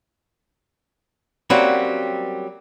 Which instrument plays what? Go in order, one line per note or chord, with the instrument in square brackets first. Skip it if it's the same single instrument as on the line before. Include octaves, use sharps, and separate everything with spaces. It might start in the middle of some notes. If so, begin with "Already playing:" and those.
[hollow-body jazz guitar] F#3 G3 A#3 C4 C#4 F#4